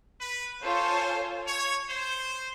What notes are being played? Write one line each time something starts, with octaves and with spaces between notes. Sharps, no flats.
B4
F4 A4 C5 C#5 F5 G#5
C#5
C5